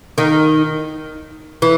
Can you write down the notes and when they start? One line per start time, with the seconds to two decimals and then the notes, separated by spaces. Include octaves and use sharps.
0.18 D#3 D#4
1.62 E3